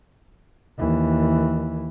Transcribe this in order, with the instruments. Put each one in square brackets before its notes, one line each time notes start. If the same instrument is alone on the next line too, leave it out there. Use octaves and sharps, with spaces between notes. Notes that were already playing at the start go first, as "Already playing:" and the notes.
[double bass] D#2 E3